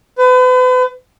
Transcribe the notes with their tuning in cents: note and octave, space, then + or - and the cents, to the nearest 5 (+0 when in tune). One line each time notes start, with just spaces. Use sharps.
B4 +40